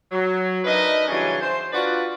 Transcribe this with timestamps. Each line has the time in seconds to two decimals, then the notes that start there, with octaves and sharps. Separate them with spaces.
0.12 F#3
0.64 D4 D#4 A#4 B4 D#5 E5
1.08 C#3 E3 F#3 G3 C#4 D4
1.41 C5
1.72 D4 F4 F#4 B4 D5